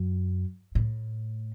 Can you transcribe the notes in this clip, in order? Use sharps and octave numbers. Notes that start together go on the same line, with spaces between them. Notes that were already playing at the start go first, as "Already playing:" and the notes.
Already playing: F#2
A2